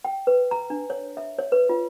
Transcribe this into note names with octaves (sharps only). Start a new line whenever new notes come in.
G5
B4
A#5
D4
C#5
E5
C#5
B4
F4